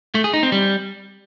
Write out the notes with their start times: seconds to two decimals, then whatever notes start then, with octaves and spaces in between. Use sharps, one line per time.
0.15 A3
0.24 G#4
0.33 D#4
0.43 C4
0.52 G3